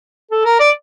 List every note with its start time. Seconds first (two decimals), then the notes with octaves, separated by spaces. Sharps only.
0.31 A4
0.45 A#4
0.60 D5